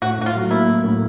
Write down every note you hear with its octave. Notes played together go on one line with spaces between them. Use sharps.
A2 F#4
A2 F#4
F4
F#3
A#3 E4
A2
A2